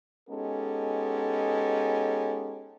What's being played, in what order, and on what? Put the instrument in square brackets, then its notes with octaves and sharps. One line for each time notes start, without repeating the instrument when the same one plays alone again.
[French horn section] G#3 B3 C#4 D#4 G4 A4